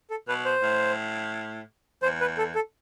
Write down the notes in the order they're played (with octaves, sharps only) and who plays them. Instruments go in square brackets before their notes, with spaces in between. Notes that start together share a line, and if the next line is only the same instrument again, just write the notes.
[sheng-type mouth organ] A4
[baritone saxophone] B2 [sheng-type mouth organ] B4
[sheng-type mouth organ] C5
[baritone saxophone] A2
[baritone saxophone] E2 [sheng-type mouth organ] C5
[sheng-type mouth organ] B4
A4
A4